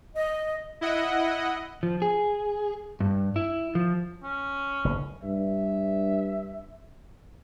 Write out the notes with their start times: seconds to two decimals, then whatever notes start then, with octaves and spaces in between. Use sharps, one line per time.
0.16 D#5
0.81 E4 D#5 F#5
1.83 F3
2.02 G#4
3.00 G2
3.36 E4
3.75 F3
4.23 C#4
4.85 F#1 A2 C#3
5.23 G2 E5